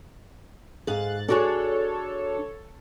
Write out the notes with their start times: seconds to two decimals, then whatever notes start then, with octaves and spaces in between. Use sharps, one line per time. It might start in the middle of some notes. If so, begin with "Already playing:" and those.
0.87 G#2 G#4 F5 F#6 A6
1.28 D4 F#4 G#4 A4 C#5